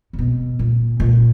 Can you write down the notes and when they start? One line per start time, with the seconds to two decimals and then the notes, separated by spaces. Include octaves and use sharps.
0.13 C#3
0.19 B2
0.59 A#2
1.00 A#2